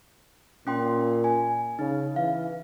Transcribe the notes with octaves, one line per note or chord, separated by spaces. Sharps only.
A#2 C#4 G5 C6
G#5
C#3 D#4
E3 F5